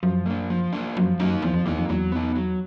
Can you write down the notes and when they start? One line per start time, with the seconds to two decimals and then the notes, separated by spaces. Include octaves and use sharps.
0.03 F#2 F3
0.26 A#3 D4
0.50 F3
0.73 A#3 D4
0.96 F#2 F3
1.20 F#2 A#3 D#4
1.42 E2 F3
1.54 F2
1.66 E2 A#3 D#4
1.78 F2
1.89 E2 F#3
2.12 B3 D#4
2.36 F#3